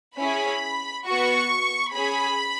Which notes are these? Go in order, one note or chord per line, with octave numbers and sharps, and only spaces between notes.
C#4 E4 G#4 B5
B3 F#4 C#6
C#4 G#4 B5